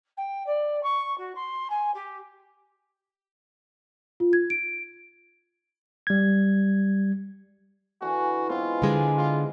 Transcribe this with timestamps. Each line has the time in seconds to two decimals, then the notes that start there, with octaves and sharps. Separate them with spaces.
0.17 G5
0.46 D5
0.83 C#6
1.17 F#4
1.35 C6
1.70 G#5
1.94 G4
4.20 F4
4.33 G#6
4.50 D7
6.07 G3 G#6
8.02 D3 E3 F#4 G#5
8.50 G#3 B3 C4 F4
8.82 D3 G#3 D5 D#5 G#5
9.18 F4